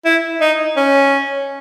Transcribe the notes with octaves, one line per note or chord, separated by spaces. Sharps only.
E4
D#4
C#4